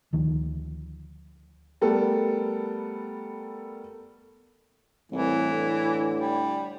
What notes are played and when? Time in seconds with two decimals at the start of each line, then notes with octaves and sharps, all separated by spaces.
0.13 D2 D#3 F3
1.81 G3 A3 B3 A4 A#4
5.12 C2 A2 E3
5.52 D3
6.16 G3